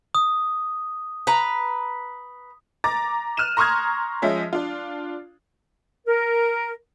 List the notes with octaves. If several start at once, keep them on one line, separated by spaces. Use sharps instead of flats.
D#6
B4 A#5
A#5 D6 A6
F6 F#6 D#7 E7
A#5 C6 C#6 D#6 F6 G#6
F3 G#3 C#4 E5
D4 F4
A#4